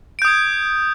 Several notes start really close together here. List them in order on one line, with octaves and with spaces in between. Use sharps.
D7 G6 D#6 G#6